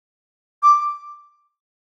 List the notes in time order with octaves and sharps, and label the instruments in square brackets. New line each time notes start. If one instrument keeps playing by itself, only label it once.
[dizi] D6